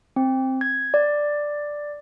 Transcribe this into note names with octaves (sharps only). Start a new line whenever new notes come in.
C4
G#6
D5